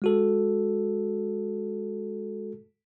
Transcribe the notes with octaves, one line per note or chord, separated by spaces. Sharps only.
G#3 F#4 A4